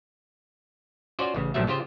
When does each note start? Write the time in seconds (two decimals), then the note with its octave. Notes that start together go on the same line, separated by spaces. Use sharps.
1.19 C#4 F4 F#4 C5 D5
1.35 A1 C#3
1.54 A#1 G2 A#2 F#3 A3 E5
1.67 C#3 F4 G4 C5